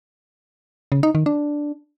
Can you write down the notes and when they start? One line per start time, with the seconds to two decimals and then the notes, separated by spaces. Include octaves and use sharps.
0.92 C#3
1.03 D#4
1.15 D#3
1.26 D4